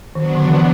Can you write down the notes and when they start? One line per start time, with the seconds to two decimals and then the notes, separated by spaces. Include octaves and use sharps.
0.15 D#3 F#3 B3 D4
0.35 D3
0.45 E3
0.56 E3